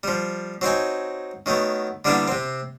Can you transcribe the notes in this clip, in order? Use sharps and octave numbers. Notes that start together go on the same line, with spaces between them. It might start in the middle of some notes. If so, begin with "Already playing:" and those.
F3 G3
F#3 C4 D#4 G#5
D#3 F#3 A3 B3
D3 G3 A#3 B3 D4 E4
C3 C4